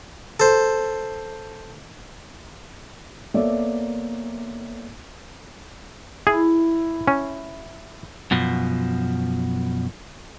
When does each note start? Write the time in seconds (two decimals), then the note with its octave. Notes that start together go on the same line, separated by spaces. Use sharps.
0.40 A4 C5
3.34 A#3 B3 A4 C#5 D5 E5
6.27 E4 G#4
7.08 C#4
8.31 F#2 B2 F3